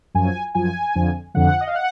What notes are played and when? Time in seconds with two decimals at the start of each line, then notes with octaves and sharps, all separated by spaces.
0.14 F#2 F3 G#5
0.55 F#2 F3 G#5
0.95 F2 D3 F3
1.34 F2 D3 F3 F#5
1.61 D#5
1.68 F5
1.75 F#5